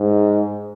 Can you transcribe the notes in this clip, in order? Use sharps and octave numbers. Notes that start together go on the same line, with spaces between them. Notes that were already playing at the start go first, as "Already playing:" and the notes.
Already playing: G#2